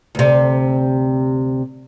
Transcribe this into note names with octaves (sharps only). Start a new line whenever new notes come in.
D2 C3